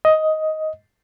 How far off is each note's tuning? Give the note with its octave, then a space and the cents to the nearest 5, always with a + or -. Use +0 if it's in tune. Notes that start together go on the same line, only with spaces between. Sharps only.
D#5 +10